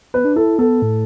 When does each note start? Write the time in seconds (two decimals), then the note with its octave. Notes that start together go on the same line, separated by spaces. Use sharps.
0.14 B3 B4
0.25 D4
0.36 E4 A4
0.59 B3 A4
0.82 A2